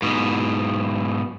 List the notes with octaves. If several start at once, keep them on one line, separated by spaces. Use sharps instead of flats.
G#2 B2